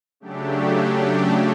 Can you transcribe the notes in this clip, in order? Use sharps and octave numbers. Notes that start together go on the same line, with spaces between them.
C#3 F#3 A3 D4 G4